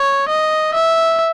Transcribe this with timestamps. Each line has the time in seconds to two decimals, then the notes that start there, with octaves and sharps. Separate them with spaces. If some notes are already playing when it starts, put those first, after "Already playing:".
Already playing: C#5
0.29 D#5
0.74 E5